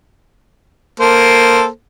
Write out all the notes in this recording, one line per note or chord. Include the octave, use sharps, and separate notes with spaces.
A#3 A4 C5